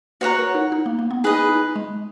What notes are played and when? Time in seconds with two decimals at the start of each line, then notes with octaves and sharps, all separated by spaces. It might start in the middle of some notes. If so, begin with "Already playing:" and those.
0.21 F#4 B4 C#5 F#5 A#5
0.39 A#4
0.55 D#4
0.72 D#4
0.86 A#3
0.99 A#3
1.11 B3
1.24 D#4 G#4 B4 D#5
1.49 D#4
1.76 G#3